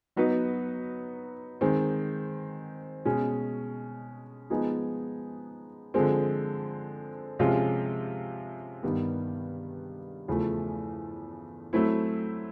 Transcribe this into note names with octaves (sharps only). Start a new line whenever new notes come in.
F#3 B3 D#4 F#4 B4
D#3 G#3 C4
B2 G#3 C#4
F3 G#3 B3 D#4 G#4
D3 F3 G#3 C4
C3 F3 G#3 C#4 F4
G2 D#3 G3 B3
E2 C#3 F3 A3
F#3 A3 C4 E4